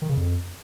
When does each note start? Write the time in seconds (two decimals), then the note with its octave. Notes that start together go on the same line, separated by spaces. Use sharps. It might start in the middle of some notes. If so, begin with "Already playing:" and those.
0.02 D#3
0.09 C#3
0.17 F2